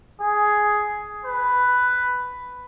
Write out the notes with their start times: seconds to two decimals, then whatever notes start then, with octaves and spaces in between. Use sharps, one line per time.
0.21 G#4
1.25 B4